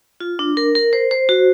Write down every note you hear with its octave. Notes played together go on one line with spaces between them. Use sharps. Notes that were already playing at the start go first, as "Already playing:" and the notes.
F4
D4
A#4
A#4
C5
C5
F#4